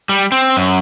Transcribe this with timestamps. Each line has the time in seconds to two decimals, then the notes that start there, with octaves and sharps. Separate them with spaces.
0.09 G3
0.32 C4
0.57 F#2